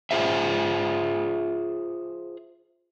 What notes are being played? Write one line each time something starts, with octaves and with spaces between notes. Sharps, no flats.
F4 G#4 C5 E5